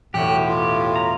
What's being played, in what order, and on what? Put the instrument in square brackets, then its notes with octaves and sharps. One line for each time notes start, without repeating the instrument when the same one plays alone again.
[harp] E1 [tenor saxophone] A2 [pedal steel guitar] F#4 G4 [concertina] G5 F#6
[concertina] F4 [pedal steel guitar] G4
[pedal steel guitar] A#5